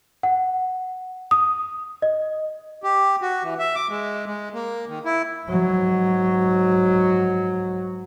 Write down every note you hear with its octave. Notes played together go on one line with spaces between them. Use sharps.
F#5
D#6
D#5
G4
F#4
E3
E5
D6
G#3
G#3
A#3
D#3
E4
G#2 F#3